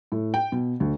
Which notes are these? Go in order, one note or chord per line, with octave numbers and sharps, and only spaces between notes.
A2
G5
B2
D2